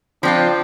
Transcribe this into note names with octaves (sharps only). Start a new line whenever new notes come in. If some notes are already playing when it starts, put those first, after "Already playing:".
F3 C4 D4 F4